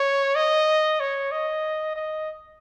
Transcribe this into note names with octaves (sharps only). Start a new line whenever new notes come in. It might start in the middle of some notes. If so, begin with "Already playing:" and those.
Already playing: C#5
D#5
C#5
D#5
D#5